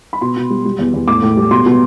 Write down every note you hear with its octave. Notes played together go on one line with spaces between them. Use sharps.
B5
B2 C6
B2
G3
G3
E2
E2
A2 D6
A2
G3
B2 C6
B2